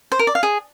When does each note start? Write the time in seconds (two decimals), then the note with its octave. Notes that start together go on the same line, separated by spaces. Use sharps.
0.12 C5
0.19 A#4
0.27 D5
0.35 F5
0.43 G#4